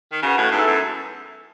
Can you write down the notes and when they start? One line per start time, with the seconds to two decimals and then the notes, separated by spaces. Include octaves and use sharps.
0.12 D#3
0.23 C#3 F#4 B4 F#5
0.38 A2
0.52 G#2 B3 E4 A4 E5
0.67 F#2